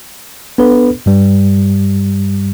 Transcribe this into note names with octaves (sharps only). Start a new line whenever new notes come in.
B3 D4 A4 B4
G2 G3